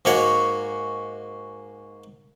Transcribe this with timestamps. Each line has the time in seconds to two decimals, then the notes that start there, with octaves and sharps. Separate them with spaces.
0.05 G#2 A#3 F#4 C#5